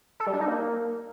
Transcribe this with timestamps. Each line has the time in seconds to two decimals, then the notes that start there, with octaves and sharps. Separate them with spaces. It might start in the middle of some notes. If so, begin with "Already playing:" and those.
0.20 A4
0.27 G3
0.34 D4
0.40 D#4
0.47 A#3